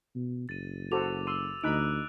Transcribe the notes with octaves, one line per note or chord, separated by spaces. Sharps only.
B2
F#1 A6 D#7
F#4 A4 C5 D6 F7
C6 E6 D#7
D2 D#4 B5 F#6 D7